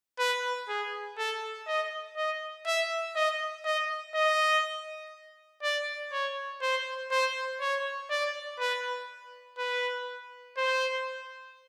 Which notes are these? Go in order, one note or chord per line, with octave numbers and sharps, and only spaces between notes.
B4
G#4
A4
D#5
D#5
E5
D#5
D#5
D#5
D5
C#5
C5
C5
C#5
D5
B4
B4
C5